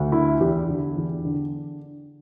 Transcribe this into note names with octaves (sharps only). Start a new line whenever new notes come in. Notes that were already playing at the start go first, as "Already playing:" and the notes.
Already playing: D2
D3 E4
E2 G4
D3
E2
D3